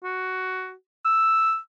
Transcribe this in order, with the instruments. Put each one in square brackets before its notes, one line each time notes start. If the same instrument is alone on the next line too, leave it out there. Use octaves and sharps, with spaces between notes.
[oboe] F#4
E6